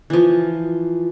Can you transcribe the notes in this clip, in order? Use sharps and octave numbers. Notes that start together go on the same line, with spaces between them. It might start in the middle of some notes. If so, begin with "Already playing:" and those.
E3 F3